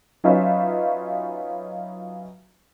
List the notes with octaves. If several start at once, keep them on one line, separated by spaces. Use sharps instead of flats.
F#3 C#4 D#4 F4 B4 E5